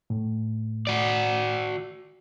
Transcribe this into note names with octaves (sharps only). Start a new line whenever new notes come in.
A2
F#4 D5